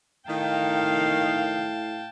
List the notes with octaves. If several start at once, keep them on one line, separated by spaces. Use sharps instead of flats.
A2 D#3 F5 G5 A5